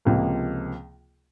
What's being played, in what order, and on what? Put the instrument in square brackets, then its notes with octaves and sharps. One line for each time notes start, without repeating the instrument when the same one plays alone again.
[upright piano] C#2 C3 F3 A#3